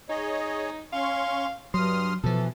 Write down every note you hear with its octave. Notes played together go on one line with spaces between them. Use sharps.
D#4 G#4 C#5 D#5
C#4 F5 C6 C#6
G2 F#3 C6 D#6 F6
B2 E3 F3 A4